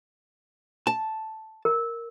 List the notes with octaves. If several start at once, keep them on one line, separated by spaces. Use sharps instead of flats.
A5
A#4